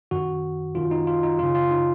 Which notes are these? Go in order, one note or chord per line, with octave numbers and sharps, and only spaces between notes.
F#2 D#3 F#4
F#2 D#3 F4
D#4
F4
D#4
F#2 C#3 F4
F4
D#4